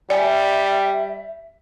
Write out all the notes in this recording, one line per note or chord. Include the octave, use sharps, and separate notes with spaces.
G3 D5 E5 G#5